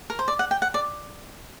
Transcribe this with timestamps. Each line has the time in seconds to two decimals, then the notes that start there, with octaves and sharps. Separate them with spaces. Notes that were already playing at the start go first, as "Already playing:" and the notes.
0.10 A#4
0.19 C5
0.28 D5
0.39 F#5
0.51 G5
0.62 F#5
0.74 D5